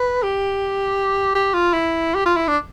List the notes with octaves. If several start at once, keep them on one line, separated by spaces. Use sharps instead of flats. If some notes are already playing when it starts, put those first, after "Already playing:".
Already playing: B4
G4
G4
F4
E4
G4
F4
E4
D4